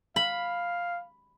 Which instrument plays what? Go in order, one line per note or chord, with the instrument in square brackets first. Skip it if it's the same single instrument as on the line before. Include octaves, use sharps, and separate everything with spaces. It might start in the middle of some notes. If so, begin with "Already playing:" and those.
[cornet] F5 [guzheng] B5